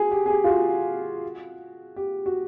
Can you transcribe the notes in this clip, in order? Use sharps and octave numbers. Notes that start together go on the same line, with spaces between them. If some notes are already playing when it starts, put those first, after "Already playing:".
Already playing: F#4 G#4
G4
G#4
G4
F4
F#4
G4
F#4